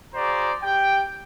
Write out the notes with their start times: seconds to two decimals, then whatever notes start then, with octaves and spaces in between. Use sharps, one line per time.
0.14 F#4 G#4 C5 D5 A#5
0.63 G4 G5